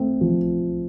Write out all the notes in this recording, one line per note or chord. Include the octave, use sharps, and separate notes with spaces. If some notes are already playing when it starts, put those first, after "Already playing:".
Already playing: A3 C4
F3